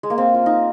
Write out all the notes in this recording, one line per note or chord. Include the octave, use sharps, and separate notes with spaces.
G#3
A#3
C4
F4
D#4